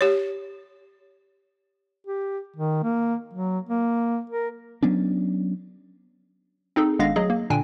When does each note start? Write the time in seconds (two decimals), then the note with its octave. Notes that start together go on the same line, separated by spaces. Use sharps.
0.01 G4 C#5
2.07 G4
2.56 D#3
2.83 A#3
3.33 F#3
3.69 A#3
4.30 A#4
4.83 F#3 B3 C#4 D4
6.76 C4 D#4 G#4 A4
6.99 G#1 G#3 B3 D4 F5 A#6
7.16 F#3 A3 G#4 D#5
7.30 A#3
7.50 A#2 D3 D4 G5 G#5